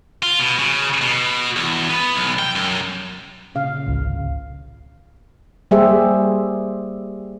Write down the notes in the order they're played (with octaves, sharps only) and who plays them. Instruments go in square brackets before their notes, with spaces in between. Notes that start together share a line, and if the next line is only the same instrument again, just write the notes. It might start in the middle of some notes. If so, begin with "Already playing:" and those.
[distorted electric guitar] F4
B2
C#3
B2
E2
B3
B1
G5
F#2
[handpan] A#2 C#3 F5
[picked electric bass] G#1 C#2
[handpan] G3 A#3 G4 G#4 C5 E5